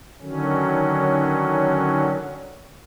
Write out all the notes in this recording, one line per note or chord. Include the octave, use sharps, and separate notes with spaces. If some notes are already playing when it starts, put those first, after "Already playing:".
D3 D#3 F#3 C#4